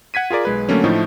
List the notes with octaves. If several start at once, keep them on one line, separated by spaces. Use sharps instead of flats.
F#5 G#6 B6 D#7
F4 G#4 A#4 D5
B1 G#3 B4
D3 F#3 A3 A#3 C#4
A2 F3 A3 D#4 E4